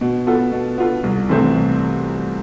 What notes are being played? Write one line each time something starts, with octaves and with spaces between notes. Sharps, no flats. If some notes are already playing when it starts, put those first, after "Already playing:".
B2
B3 F4 A4
B2
B3 F4 A4
C2
C3 E3 A3 C4
C2